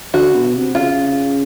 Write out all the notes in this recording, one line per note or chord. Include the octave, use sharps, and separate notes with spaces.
D3 F#4
B2
C3
C#3 F4